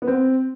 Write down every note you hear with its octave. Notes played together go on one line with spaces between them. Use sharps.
B3
C4